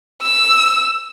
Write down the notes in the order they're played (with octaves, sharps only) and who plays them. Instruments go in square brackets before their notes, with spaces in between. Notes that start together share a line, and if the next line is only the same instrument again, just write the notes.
[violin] E6